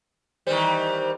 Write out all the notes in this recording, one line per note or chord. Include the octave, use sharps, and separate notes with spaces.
D#3 E3 G3 C5